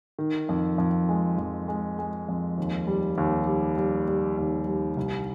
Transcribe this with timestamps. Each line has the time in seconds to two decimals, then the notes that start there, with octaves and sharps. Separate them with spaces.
0.19 D#3
0.49 F2
0.78 F2
1.09 G#3
1.38 F2
1.68 G#3
1.99 G#3
2.29 F2
2.58 D#2
2.87 G3
3.18 D#2
3.47 G3
3.77 G3
4.08 G3
4.37 D#2
4.67 G3
4.97 C2